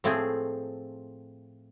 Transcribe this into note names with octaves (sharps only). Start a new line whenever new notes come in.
A2 F3 A3 C4 G#4